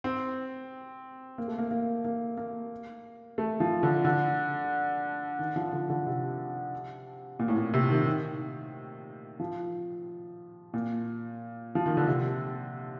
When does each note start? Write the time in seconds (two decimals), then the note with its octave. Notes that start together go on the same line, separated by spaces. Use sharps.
0.04 C4
1.38 A#3
1.48 A3
1.59 A#3
1.71 A#3
2.05 A#3
2.37 A#3
3.38 A3
3.60 F3
3.83 D3
4.05 D3
5.39 D#3
5.56 F3
5.73 D3
5.90 D3
6.06 C3
7.39 A#2
7.48 A2
7.56 A#2
7.73 C3
7.90 D#3
8.06 D#3
9.40 F3
10.74 A#2
11.75 F3
11.86 D#3
11.97 D3
12.07 C3